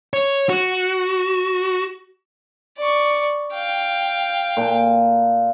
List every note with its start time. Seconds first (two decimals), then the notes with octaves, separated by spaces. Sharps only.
0.14 C#5
0.49 F#4
2.78 D5 C#6
3.54 F5 G5
4.57 A#2 A5